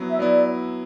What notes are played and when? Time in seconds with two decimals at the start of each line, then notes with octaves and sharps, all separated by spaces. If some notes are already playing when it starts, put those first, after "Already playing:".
Already playing: F#3 B3 E4
0.09 E5
0.19 F#3 B3 E4 D5